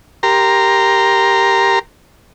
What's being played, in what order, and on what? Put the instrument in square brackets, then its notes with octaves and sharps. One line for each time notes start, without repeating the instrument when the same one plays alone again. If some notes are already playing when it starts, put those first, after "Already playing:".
[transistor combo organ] G4 A#4 A#5 C6